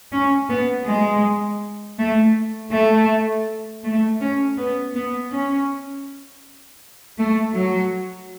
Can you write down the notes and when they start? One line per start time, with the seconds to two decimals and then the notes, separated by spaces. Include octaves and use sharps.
0.13 C#4
0.49 B3
0.87 G#3
1.99 A3
2.72 A3
3.84 A3
4.21 C#4
4.58 B3
4.95 B3
5.32 C#4
7.18 A3
7.55 F#3